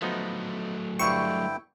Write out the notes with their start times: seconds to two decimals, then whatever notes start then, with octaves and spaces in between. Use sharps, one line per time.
0.02 F3 F#3 A3 B3 D#4
0.99 G2 D3 E4 C5 G5 C#6